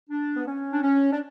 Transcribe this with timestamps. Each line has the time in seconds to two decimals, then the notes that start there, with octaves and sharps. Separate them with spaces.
0.10 D4
0.36 B3
0.47 C#4
0.73 D4
0.83 C#4
1.12 D4